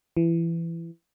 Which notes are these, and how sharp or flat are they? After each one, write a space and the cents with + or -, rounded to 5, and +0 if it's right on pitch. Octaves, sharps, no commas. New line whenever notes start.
E3 +20